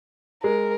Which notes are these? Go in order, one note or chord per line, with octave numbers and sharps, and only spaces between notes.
G#3 A#4